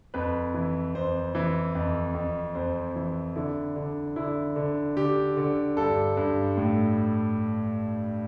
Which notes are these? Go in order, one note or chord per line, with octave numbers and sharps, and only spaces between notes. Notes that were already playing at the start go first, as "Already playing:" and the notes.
F2 B4
E3
F2 C5
E3
F2
F2
F2 C5
E3
D3 E4
D3
D3 E4
D3
D3 G4
D3
G2 A4
G2
A2